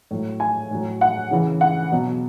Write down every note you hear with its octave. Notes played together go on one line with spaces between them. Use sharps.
A2 F#3
G#5
A2 F#3
F#5
C#3 E3
F#5
B2 F#3